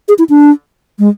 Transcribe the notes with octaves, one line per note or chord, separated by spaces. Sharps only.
G#4
E4
D4
G#3